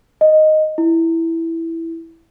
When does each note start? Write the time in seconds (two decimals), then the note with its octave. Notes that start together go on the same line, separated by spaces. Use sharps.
0.21 D#5
0.78 E4